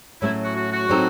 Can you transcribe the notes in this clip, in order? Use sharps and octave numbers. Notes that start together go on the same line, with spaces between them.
A2 F#3 A3 C#4 E4
F#4
F#4
F#4
A2 F#3 C4 D#4 A4